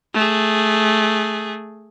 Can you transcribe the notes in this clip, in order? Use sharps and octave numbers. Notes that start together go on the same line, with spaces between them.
A3 G#4